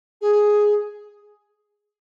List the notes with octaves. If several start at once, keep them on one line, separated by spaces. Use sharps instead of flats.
G#4